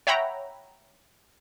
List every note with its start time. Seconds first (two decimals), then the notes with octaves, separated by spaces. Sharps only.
0.07 C#5 E5 F#5 G5 A#5 B5